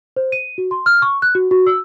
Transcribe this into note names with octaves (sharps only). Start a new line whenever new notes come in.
C5
D#7
F#4
C6
F6
C#6
F#6
F#4
F#4
E6